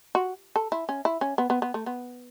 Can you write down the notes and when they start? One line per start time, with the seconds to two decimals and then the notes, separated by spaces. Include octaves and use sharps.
0.15 F#4
0.56 A4
0.72 E4
0.89 C#4
1.05 E4
1.21 C#4
1.38 B3
1.50 B3
1.62 B3
1.74 A3
1.86 B3